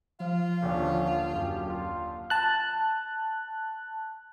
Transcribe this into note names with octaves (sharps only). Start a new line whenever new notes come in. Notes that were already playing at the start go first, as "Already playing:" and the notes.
F3 F4 F5
D#1 D3 C#4
F#2 G4
F4
A5 F#6